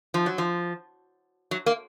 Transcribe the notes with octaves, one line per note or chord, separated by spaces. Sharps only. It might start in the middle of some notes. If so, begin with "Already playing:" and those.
F3
F#3
F3
F#3
A#3